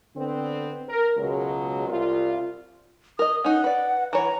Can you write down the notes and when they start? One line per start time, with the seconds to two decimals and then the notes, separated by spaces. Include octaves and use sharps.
0.16 D3 B3 C4
0.88 A#4
1.17 C#2 B2 F#3 G#3
1.87 C2 F4
3.19 A#4 D#5 D#6
3.44 C#4 D#4 F#5
3.64 B4 D5
4.13 E3 C#5 A#5